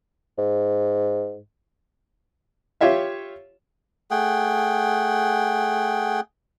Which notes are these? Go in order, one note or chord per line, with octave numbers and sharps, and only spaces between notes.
G#2
F4 G4 C#5 E5 F5
A3 G#4 F#5 G5